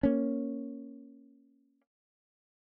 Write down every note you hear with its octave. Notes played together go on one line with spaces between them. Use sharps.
A#3 C#4